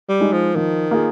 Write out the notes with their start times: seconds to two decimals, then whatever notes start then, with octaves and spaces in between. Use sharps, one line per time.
0.09 G3
0.21 G#3 D#4
0.33 F3
0.55 D#3 F3
0.91 A#3 F4 G#4